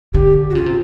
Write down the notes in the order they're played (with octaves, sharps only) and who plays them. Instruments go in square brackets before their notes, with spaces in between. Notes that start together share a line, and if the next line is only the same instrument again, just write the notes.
[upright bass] D3 [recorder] G4
[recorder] F#4
[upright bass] C#3 [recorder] F4
[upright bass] C3